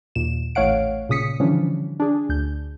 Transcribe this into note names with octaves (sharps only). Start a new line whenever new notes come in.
D#2 A#2 E7
A1 A3 C#5 F5 F#5 D7
A#2 C#3 D#6 B6 C#7
D3 E3 F3 G3 C#4 D4
D4 G#4
D2 G6